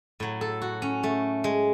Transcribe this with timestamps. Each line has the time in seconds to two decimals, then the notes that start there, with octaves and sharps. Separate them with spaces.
0.20 A2 F#3
0.41 A4
0.62 F#4
0.82 C#4
1.03 A3
1.44 G#3